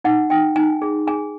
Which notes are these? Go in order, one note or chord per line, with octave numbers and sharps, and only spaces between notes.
D#4 F#5
D#4 G5
D#4 G#5
G#4
G#4 G#5